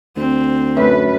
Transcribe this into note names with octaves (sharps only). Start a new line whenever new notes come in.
D2 C4
F#2 A3 B4